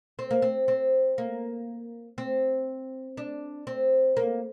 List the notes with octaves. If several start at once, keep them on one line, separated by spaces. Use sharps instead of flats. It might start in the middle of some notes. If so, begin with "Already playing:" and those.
C4
A#3
C4
C4
A#3
C4
D4
C4
A#3